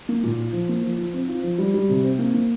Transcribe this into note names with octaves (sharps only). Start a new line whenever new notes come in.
A#3
A#2
F4
F3
A#3
F3
F3
C4
F4
F3
G3
G3
C3
C4
A#3
A#3